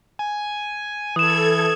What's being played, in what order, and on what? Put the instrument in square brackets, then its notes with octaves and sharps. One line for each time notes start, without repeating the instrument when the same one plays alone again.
[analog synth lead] G#5
[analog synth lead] E3 [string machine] A4 G#6 [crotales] D#6 E7